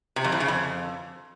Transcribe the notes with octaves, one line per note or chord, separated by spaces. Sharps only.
C3
F2
A2
C#3
F2